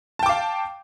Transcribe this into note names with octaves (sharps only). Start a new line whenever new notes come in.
F5 G5 A5 D6